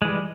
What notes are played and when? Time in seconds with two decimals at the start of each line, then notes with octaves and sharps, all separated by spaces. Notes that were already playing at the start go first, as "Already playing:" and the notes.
0.02 G#3
0.05 E3
0.08 G3